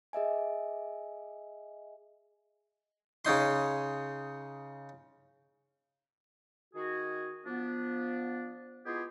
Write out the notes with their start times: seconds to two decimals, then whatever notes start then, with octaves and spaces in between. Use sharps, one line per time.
0.13 G#4 D#5 E5 G#5
3.25 C#3 C#4 D#4 C6
6.74 D#3 F#4 G#4
7.46 F3 B3 D4
8.85 G#3 B3 E4 F4 G4 G#4